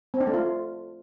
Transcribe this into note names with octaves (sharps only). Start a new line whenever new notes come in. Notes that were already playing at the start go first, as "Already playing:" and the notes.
C4
D4
A3
F4